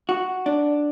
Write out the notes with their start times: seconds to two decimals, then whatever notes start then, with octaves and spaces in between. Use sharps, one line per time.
0.09 F#4
0.46 D4